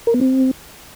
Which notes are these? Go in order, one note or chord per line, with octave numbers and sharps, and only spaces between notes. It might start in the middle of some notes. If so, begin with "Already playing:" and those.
A#4
B3
C4